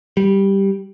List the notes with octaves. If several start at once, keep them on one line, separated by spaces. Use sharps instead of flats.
G3